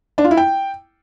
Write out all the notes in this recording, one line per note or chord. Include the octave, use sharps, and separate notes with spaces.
D4
F4
E4
G5